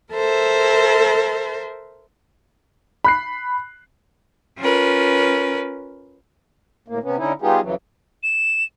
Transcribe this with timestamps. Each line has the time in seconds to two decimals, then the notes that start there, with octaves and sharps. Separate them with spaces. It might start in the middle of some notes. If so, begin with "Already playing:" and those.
0.13 A4 A#4 C5 E5
3.04 B5 F#6 C7
4.59 C#4 F4 A#4 B4
6.88 D2 A2 A#3
7.03 C3 B3 C#4
7.17 D3 C#4 D#4 E4
7.42 G3 B3 D#4 F4 G4 G#4
7.62 F2 C#3 E3 F#3
8.23 E7